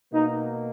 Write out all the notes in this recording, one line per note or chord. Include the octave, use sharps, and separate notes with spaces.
B2 A#3 D#4